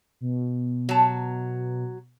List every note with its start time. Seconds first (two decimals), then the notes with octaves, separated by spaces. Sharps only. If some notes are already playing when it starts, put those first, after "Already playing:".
0.21 B2
0.89 F#3 A5